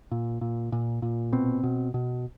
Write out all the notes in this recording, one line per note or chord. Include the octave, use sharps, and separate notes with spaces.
A#2
A#2
A#2
A#2
B2 C4
B2
B2